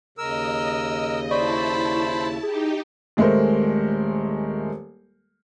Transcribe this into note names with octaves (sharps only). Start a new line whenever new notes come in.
D#2 C#3 A#4 D#5 E6
E4 C5 D5 A5 B5 C#6
D#4 G4 G#4
D#1 G#3 A3 A#4 C5